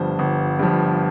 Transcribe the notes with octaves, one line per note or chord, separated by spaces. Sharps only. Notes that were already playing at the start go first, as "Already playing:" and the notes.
Already playing: G1 G2 F3 C5
G1
G2 F3